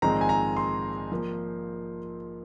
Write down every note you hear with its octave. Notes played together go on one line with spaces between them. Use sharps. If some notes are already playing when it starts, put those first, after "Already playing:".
A#1 G#2 D#3 G#3 C4 A#5
G#5
A#5
C6
F3 A#3